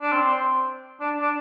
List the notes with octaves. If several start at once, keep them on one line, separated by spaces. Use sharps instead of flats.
D4
C4
D4
D4